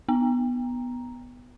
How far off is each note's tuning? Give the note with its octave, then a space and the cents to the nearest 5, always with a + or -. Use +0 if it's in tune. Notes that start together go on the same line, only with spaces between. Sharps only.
B3 +0 A#5 +0